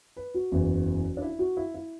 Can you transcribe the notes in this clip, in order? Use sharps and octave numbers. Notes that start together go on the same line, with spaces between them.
B4
F#4
F#1 E2 E3
D4
E4
F#4
E4
E4